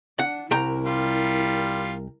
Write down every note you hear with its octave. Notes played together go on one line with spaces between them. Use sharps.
D4 F#5
C2 E4 A#4 G5 A#5
G3 F4